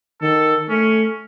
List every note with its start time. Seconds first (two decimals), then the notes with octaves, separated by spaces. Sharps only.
0.21 D#3 A4
0.69 A3 C#4